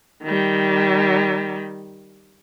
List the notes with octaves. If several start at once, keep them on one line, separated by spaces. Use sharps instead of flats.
D#3 G3